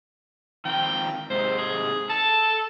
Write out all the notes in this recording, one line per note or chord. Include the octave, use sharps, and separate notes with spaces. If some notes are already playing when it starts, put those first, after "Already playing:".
D#3 F3 C4 G5
G#2 C3 G#3 C5
G#4
A4 A5